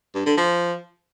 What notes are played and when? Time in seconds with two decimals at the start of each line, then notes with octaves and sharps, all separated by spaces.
0.15 G2
0.26 D3
0.37 F3